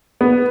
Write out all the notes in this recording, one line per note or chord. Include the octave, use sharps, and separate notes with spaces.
B3